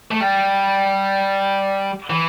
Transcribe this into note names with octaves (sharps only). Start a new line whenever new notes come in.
A3
G3
E3